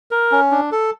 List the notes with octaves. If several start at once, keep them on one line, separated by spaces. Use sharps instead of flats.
A#4
C#4
D4
A4